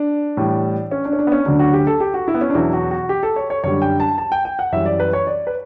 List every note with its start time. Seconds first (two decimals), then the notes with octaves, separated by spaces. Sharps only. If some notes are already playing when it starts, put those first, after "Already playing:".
Already playing: D4
0.37 A2 E3 G3
0.91 C#4
1.05 D4
1.13 C#4
1.19 D4
1.27 B3
1.32 C#4
1.46 D2 D3 F#3 D4
1.59 F#4
1.73 G4
1.87 A4
2.00 G4
2.14 F#4
2.28 E4
2.34 B3
2.41 C#4
2.50 D4
2.55 E2 B2 F#3 E4
2.73 F#4
2.91 F#4
3.09 G4
3.23 A4
3.36 C#5
3.50 C#5
3.64 F#2 D3 G3 C#5
3.82 G5
4.00 A5
4.18 A5
4.32 G5
4.45 G5
4.59 F#5
4.72 F#2 E3 G3 E5
4.86 D5
5.00 B4
5.13 C#5
5.27 D5
5.47 B4